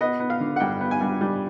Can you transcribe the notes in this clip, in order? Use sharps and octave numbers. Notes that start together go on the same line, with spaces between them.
B3 D#5
B3
F5
D3
F#5
G2 G5
B3
G#5
G2
G3